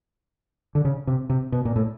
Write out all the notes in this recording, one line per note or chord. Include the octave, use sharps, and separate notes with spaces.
D3
C#3
C3
C3
B2
A#2
A2